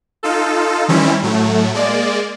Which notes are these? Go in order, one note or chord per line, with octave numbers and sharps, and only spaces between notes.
D#4 F4 A4
D#3 E3 G3 C4 C#4 E4
A2 F#3 A3
G#3 A#3 D5